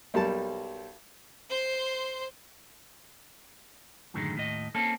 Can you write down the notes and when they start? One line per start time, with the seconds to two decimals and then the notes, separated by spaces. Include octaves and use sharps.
0.14 B1 G3 A#3 A5
1.50 C5 C6
4.14 F#2 A2 D3 D#3 G#3
4.35 D#2 A2 D#5
4.75 A#3 C4 C#4 A4